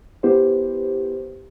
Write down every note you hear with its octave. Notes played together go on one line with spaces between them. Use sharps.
B3 E4 G4 B4 C5